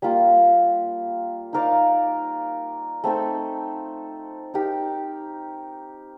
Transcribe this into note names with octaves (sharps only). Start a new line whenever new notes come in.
G3 A#3 F4
D#4 A#4 D5 F5
A3 C4 D#4 A4
D#4 G4 A#4